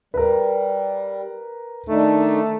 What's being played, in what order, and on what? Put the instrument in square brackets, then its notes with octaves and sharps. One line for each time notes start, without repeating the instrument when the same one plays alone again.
[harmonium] G3 [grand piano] A#4 B4
[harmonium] D#3 D4 D#4 [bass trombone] A3